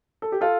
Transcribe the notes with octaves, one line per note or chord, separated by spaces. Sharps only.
A4
G4
F4 A4